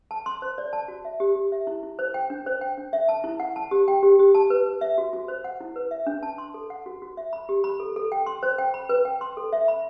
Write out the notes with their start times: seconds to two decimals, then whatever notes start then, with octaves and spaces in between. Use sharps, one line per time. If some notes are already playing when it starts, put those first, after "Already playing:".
0.11 A5
0.26 C6
0.42 C5
0.58 D5
0.73 A5
0.88 F#4
1.05 E5
1.20 G4
1.35 G4
1.52 E5
1.67 E4
1.83 E4
1.99 C5
2.14 G5
2.30 D4
2.46 C5
2.61 G5
2.78 D4
2.93 E5
3.09 A5
3.24 E4
3.40 F#5
3.56 A5
3.71 G4
3.88 G5
4.03 G4
4.19 G4
4.35 A5
4.50 B4
4.66 B4
4.81 E5
4.98 F#4
5.13 F#4
5.28 C5
5.44 F#5
5.61 E4
5.76 B4
5.91 E5
6.07 D4
6.23 A5
6.38 C6
6.54 A4
6.70 F#5
6.86 F#4
7.02 F#4
7.17 E5
7.33 B5
7.49 G4
7.64 B5
7.80 A4
7.96 A4
8.12 G5
8.26 C6
8.43 C5
8.58 G5
8.74 B5
8.89 B4
9.05 G5
9.21 C6
9.37 A4
9.53 E5
9.68 B5